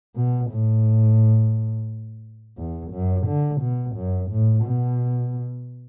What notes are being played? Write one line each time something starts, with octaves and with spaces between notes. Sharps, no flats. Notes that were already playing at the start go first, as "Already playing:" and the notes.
B2
A2
E2
F#2
D3
B2
F#2
A2
B2